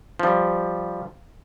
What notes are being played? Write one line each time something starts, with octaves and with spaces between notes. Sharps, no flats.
F3 G3